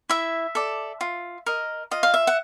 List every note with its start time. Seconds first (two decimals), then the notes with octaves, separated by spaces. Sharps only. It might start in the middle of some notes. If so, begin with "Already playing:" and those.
0.10 E4 E5
0.55 A4 D5
1.01 F4
1.46 A#4 D#5
1.91 F4 D#5
2.03 F5
2.14 E5
2.27 F#5